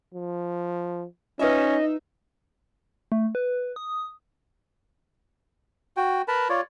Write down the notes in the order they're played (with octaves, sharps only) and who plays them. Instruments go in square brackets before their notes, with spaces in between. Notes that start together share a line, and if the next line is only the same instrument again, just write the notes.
[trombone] F3
[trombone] C#4 [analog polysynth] D#4 E5 [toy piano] F4 B4 [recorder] D#5
[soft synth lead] A3
B4
D#6
[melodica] F#4 G5
A#4 B4 A5 B5
F4 C#5 D5